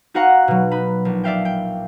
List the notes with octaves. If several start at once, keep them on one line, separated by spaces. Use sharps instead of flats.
D#4 F#4 D#5 F5 F#5 A#5
B2 F#3
D#4 B5
A#1
D5 E5 F5 G5
G5